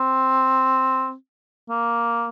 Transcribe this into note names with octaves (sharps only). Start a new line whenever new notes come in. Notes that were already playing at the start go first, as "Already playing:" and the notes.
Already playing: C4
A#3